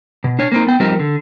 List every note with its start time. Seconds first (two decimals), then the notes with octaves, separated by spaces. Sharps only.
0.24 B2
0.39 D4 C#5
0.52 A#3 C4 D#4
0.67 B3 G5
0.80 F3 G3 C4 D#4 G4 A#4
0.99 D3